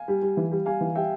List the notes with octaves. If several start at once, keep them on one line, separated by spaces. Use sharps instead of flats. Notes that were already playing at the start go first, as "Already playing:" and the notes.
Already playing: F5 G#5
G3
G3
E3
G3
G3 F5 G#5
E3
G3 E5 G5